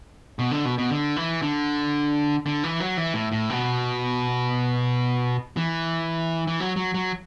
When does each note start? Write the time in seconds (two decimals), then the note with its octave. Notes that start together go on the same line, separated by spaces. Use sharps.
0.39 B2
0.51 D3
0.65 B2
0.78 B2
0.91 D3
1.16 E3
1.42 D3
2.46 D3
2.64 E3
2.80 F#3
2.97 E3
3.14 A2
3.32 A2
3.50 B2
5.57 E3
6.47 E3
6.60 F#3
6.76 F#3
6.94 F#3